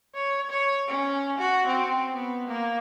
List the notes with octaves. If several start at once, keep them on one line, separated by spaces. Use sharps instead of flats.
C#5
C#5
C#4
F#4
C4
B3
A#3